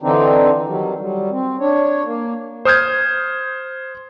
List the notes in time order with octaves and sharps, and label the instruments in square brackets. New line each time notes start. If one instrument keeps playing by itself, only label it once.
[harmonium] D3 E3 C4 D4 D#4
D#3 F#3 G3
F#3 G3
C4
D4 C#5
A#3
[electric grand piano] C5 D#6 F6 G6 G#6